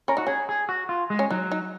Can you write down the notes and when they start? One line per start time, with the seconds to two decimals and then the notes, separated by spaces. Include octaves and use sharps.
0.08 C#4 A#4
0.17 D#4 F#4
0.27 C#4 G#4
0.49 G#4
0.69 F#4
0.89 F4
1.10 G#3
1.19 C#4
1.30 F#3 D#4
1.51 D#4